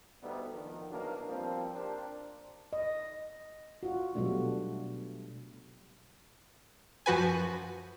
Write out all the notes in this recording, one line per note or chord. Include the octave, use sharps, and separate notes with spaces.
D2 G3 B3 D#4 A4
D#3 F3
B1 E2 B2 A#3 D4
F3 G3 A#3 C4
D4 G4 A#4 C5
D#5
F4 F#4
B2 F#3 G3 A3 D4
F#2 F3 F#4 B4 G#5